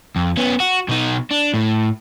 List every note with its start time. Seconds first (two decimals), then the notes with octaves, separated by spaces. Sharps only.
0.16 F2
0.37 B3 C#4
0.60 F#4
0.89 B2 D#4
1.31 D4
1.54 A2